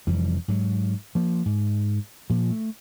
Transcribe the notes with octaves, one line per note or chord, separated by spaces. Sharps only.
F1 F2 E3 G3
G#2 F#3
F3 A#3
G#2
A#2 F3
A3